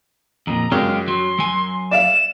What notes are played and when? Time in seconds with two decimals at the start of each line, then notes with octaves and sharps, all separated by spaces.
0.47 F2 A#2 A#5
0.71 F#2 G#3 F4 G4 F6
1.08 F#3 C6
1.39 F#3 G#5
1.91 D5 E5 F5 E7